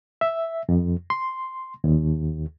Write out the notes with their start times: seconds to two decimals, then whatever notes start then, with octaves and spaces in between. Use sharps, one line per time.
0.21 E5
0.69 F2
1.10 C6
1.84 D#2